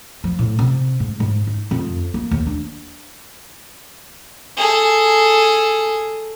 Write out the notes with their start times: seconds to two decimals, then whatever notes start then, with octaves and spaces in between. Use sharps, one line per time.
0.24 F3
0.39 A2
0.59 C3
1.00 G#2
1.20 G#2
1.47 D#4
1.71 F2
2.14 A#3
2.31 D#2
2.47 D4
4.57 G#4 A4